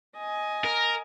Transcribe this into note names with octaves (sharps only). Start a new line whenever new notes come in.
D#5 G#5
A#4